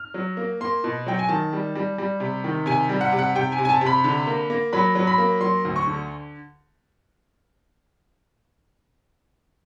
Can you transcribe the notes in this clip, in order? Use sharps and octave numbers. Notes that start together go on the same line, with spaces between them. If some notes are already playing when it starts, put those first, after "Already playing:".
Already playing: F6
F#3
A#3
A#3 C6
B2
F#3 G5
G#5
D#3 A5
G3
G3
G3
C3
D#3
C3 G#5
G3
F#5
C3
F#5
C3 G5
G#5
C3
G#5
A5
C3
B5
D3
A#3
A#3
F#3 B5
F#3
B5
A#3
F#3 C6
D2
C#6
D3